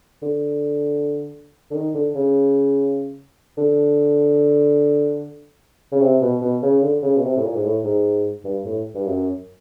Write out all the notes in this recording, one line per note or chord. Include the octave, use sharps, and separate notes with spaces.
D3
D3
D#3
D3
C#3
D3
C#3
C3
B2
B2
C#3
D3
C#3
B2
C3
A2
A#2
G#2
A2
G#2
G2
A2
G2
F#2